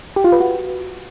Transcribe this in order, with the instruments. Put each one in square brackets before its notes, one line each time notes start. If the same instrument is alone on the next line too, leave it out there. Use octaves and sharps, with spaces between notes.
[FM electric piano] G4
F4
B4
F#4